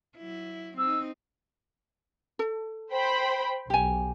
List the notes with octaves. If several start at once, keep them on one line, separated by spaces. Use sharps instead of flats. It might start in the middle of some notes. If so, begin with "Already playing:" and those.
F#3 E4
C4 D#4 E6
A4
C5 G5 B5
B1 G4 G#5